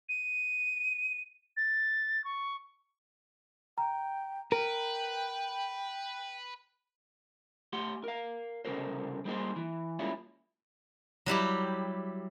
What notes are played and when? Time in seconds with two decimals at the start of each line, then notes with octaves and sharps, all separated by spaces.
0.09 D#7
1.57 A6
2.24 C#6
3.78 G5 A#5
4.52 A#4 B4 G5
7.73 A3 G4 F#5 C6
8.04 A#4 F5
8.65 C2 C#3 A#3 A4 A#4 C5
9.25 G3 A#3 C4 D#4 G#4 C5
9.56 E3
9.99 G3 G#3 A#3 C#4 E4 F4
11.26 F#3 G3 E4 G4